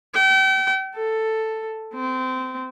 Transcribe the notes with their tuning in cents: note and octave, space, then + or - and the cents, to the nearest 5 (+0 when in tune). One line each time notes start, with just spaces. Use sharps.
G5 -40
A4 +5
C4 -25